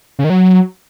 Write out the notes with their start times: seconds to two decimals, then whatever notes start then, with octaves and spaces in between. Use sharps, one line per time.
0.19 C#3
0.24 D#3
0.30 F#3